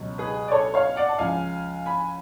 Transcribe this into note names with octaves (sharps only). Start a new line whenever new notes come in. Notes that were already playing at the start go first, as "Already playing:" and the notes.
Already playing: C#2 B2 F#3
G#4 B4
D5
A4 C#5
C#5 F5
D5 F#5
A5
C#2 C#3 F3 F5 G#5
G#5 B5